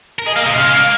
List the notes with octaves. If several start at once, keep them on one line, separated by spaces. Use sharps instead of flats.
A#4
G#4 D#5
A#3 F5
C3 D#5
C#3 F5
G#3
A#3